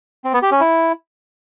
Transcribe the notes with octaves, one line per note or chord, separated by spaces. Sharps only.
C4
B3
G4
C#4
E4